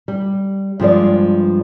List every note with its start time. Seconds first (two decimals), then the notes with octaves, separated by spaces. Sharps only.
0.08 G3
0.80 G2 F3 G#3 D5